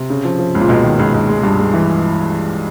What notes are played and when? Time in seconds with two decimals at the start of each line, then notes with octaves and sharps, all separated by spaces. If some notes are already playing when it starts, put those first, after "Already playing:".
Already playing: C3
0.10 C#3
0.25 F3
0.39 F3
0.55 C#2
0.60 A#2
0.69 C#2 B2
0.84 D#3
0.99 C#2
1.14 C#2
1.29 G#3
1.43 G2
1.59 G#3
1.74 E3